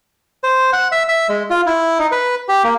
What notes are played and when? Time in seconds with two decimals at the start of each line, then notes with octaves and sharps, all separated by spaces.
0.44 C5
0.73 F#5
0.92 E5
1.08 E5
1.29 G#3
1.50 F4
1.66 E4
1.99 D#4
2.12 B4
2.49 G4
2.64 A#3